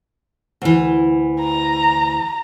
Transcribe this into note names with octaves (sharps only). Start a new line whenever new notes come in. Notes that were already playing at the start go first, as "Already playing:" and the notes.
D2 E3
A#5